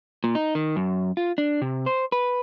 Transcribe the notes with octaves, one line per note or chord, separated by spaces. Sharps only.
A#2
D#4
D#3
F#2
F4
D4
C3
C5
B4